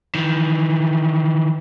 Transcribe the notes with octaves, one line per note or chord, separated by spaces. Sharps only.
D#3 E3